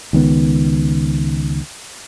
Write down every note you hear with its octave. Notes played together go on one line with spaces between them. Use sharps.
C#2 D#3 B3